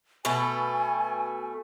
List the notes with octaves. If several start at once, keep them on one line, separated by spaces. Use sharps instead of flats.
B2 A3 G#5